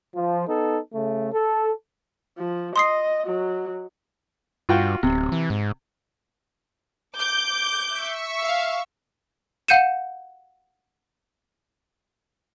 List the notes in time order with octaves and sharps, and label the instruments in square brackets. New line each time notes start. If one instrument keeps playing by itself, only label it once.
[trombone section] F3
B3 D#4 A4
C#3 A3
A4
[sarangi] F3
[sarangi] D#5 [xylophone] C6 D#6 C7
[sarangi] F#3
[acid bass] G2 [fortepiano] F4 F#4 G5
[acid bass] D1 [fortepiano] C3
[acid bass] E3
G#2
[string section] D6 G6
[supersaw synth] E5 C#6
[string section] F5
[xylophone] F5 F#5 G6 C#7 D#7 E7